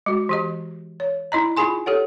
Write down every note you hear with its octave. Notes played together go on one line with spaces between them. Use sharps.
G#3 F#4
E3 G4 D#5
C#5
D#4 E4 D#5 A#5
D#4 F4 G#4 G#5 C6
G4 A4 C#5 F#5